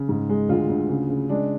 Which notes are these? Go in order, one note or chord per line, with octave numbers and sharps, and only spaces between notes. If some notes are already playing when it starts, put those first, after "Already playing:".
Already playing: C#3
G#2
G#3
D2 F4
D2
C#3
C#3
G#3 D4